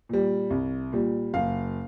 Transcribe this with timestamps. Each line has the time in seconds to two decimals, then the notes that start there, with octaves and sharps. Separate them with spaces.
0.09 A#2 G3
0.50 C2
0.93 A#2 G3
1.34 F#1 F5